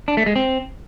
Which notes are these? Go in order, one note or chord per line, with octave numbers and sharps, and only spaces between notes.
D4
A3
G#3
C4